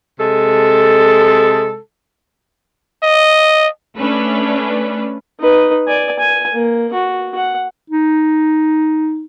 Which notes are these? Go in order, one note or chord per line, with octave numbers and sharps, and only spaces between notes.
C3 G#3 A4
D#5
A3 C#4 D4 B4
D#4 B4
D5 G#5
G#5
A#3
F#4
F#5
D#4